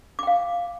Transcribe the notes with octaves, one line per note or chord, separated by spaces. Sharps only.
F5 G5 D6